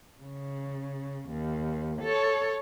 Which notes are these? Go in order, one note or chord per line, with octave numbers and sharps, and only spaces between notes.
C#3
D#2
A4 C#5